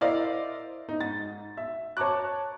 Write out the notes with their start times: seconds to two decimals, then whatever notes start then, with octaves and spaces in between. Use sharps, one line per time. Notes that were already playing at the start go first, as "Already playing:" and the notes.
0.01 E4 A#4 C5 D5 D#5 F5
0.89 D#4
1.00 G#2 A6
1.57 E5
1.97 C#5 A5 A#5 D6 F#6